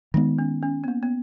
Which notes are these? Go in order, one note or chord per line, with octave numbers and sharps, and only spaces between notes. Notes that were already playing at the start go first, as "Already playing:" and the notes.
D#3 G#3 B3 D#4
C#4
C#4
B3
A#3
B3